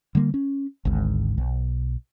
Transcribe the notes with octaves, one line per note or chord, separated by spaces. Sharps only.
D3 G3 A#3
C#4
G#1 D2 G#2
B1